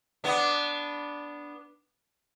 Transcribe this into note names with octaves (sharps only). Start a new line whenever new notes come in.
B3 D4